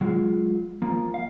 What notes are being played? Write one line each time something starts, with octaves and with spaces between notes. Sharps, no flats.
F#3 G#3 F4
F3 A#3
F5